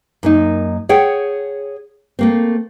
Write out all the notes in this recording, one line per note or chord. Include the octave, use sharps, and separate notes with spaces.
F#2 A#3 D#4
G#4 C#5 F#5 G5
A3 A#3 C4